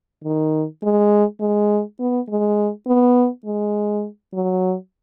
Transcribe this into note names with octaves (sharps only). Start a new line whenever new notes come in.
D#3
G#3
G#3
B3
G#3
B3
G#3
F#3